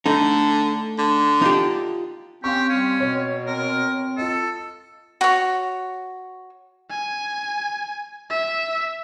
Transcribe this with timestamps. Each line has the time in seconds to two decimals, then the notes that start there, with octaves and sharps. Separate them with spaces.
0.06 D3 A3 D#4
0.98 D3
1.42 D#4 F4 G4
2.44 C4 C#4 G4 F5 C6 C#6
2.70 G3 C#4
3.00 B2 C#5
3.47 C4 A#4
4.17 F4 A4 D#5
5.21 F#4 C#5
6.90 G#5
8.30 E5